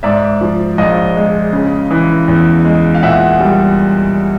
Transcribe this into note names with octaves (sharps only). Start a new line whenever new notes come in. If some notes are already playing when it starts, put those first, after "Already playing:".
G#2 D5 E5
F3
A#1 D#5 F5
G#3
C#3
E3
E2
G#3
F5
A#2 E5 F#5
G3